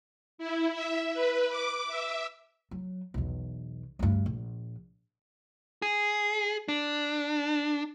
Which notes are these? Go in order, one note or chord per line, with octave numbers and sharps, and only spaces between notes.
E4
E5
B4
D6
E5
F#3
B1 E2
D2 G2
A#1
G#4
D4